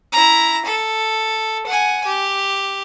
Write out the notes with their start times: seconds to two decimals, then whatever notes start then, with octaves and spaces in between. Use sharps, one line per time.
0.12 E4 A#5
0.65 A4
1.66 F#5 G#5
2.05 G4